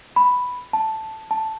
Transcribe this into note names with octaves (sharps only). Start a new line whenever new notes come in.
B5
A5
A5